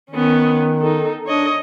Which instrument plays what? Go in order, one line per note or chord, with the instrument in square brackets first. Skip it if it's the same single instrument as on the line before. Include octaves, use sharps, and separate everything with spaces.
[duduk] D#3 [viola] B3 C#4
[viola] D#4 A4
[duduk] D4 [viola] C#5 D#5